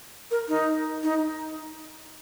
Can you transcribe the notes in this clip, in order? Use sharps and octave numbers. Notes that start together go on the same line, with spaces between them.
A#4
D#4
D#4